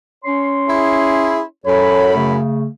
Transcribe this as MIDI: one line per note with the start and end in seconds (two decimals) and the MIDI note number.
0.24 1.42 61
0.24 1.42 73
0.24 1.42 84
0.67 1.41 64
0.67 1.41 68
1.65 2.36 42
1.65 2.13 69
1.65 2.13 73
1.65 2.36 83
2.15 2.66 49
2.15 2.66 57